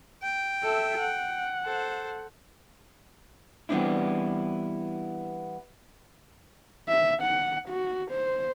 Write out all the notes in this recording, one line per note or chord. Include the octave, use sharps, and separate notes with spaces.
G5
A4 E5
F#5
A4 C5
E3 G3 B3 C4 D4 E4
E5
F#5
F#4
C5